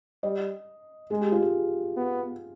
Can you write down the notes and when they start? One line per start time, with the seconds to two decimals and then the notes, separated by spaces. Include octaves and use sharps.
0.23 G3 D#5
1.11 G#3 G#4
1.21 G4
1.32 F4
1.42 G#4
1.97 B3